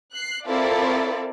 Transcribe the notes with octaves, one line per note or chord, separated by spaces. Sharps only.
F#6 C7
C4 E4 F4 A4 A#4 D5